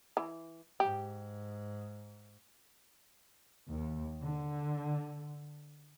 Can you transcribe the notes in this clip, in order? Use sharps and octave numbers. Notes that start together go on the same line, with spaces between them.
E3
G#2 G4
D#2
D3